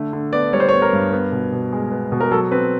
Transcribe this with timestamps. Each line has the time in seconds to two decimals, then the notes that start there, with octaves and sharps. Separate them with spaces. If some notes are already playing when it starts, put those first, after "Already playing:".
Already playing: D3 A3
0.13 D3
0.33 B3 D5
0.53 G3 C#5
0.60 C5
0.69 C#5
0.72 B3
0.82 A#4
0.93 G2
1.13 B3
1.32 B2
1.52 B2
1.73 G#3
1.91 B3
2.12 B2
2.20 A#4
2.31 F#3 A4
2.51 C4 B4